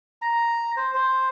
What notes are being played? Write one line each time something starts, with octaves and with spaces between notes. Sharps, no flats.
A#5
C5
C5